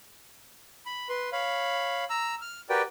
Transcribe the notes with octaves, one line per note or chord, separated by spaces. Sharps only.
B5
B4 C6
C#5 F5 B5
A#5 E6
F6
F#4 G4 A#4 B4 D5 G5